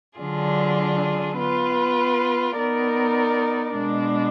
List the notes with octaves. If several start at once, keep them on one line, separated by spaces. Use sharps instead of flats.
D3 F#3 D4 F4 G#4
B3 F4 B4
B3 D#4 A#4 D5
B2 G#3 D4